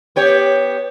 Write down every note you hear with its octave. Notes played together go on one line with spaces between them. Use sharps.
B3 G4 C#5